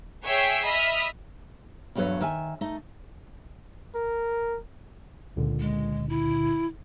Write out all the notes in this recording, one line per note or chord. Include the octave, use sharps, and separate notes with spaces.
G#4 C#5 E5 G5 E6 C7
D#5 E5 B5 D#6 F6
E2 G2 F#3 A4 B4 C#5
D#3 E5 G#5
A3 D#4
A#4
C#2 A#2 D3
G#3
E4